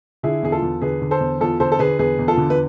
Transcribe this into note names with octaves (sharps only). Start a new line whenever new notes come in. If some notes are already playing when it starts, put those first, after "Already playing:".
D3 E4 G#4
E2 G#4
F4 A4
E2
D3 G#4 B4
D3
A4 C5
E2
E2 F4 A4
D3 A4 C5
A4
D3 G#4 B4
E2 G#4 B4
E2
F4 A4
D3
B4